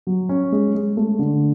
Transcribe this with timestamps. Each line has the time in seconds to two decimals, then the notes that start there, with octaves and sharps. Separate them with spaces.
0.07 F#3
0.29 C#4
0.52 G#3
0.75 G#3
0.97 A3
1.19 D3